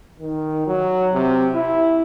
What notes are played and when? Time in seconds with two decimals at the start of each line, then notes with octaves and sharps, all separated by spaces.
0.20 D#3
0.67 F#3
1.13 C3
1.54 E4